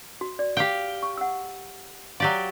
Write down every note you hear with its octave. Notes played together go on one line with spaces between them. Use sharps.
F#4
D5
G4 F5 G5
C#6
F#5 E6
F#3 G4 D5 F5